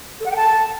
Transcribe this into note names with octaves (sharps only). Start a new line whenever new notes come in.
A4
F#5
G5
A5